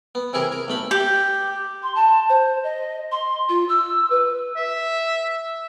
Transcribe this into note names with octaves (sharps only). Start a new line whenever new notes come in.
B3
C3 E3 E4 G#4 A#4
A#4
B1 A3 B5
G4
C6
A5
C5
D#5
C6
F4
E6
B4
E5